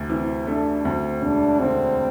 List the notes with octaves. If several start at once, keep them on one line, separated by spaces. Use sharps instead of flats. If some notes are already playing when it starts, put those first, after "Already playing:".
Already playing: D2 C3
E3 C4
A3 D4
D2 C4
E1 D4
D3 C4